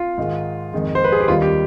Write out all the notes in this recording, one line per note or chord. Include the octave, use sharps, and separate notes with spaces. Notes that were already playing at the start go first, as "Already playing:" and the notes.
Already playing: F4
G#2 D#3 G#3
F2 D#3 G#3
C5
B4
G#4
G4
D#2 D#3 G3 F4
G4